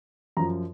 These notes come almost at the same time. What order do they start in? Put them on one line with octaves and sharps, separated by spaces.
F#2 A#5 F3